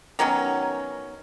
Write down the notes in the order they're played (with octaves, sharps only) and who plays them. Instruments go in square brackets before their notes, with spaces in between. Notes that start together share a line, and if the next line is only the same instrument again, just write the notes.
[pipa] D#3 F#3 B3 C#4